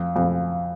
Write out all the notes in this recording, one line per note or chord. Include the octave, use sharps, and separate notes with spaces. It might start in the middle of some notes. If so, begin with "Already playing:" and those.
Already playing: F2
F2